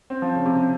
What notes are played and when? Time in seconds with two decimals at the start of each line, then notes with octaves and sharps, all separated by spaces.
0.10 C4
0.22 F3
0.35 C#3
0.46 C3